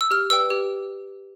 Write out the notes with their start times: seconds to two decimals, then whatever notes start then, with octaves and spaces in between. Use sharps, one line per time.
0.01 E6
0.11 G4 F6
0.30 B4 D5 G5 E6
0.50 G4